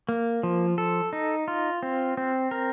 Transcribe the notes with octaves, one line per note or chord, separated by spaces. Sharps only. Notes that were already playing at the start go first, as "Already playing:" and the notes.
A#3
F3
A4
D#4
F4
C4
C4
A#4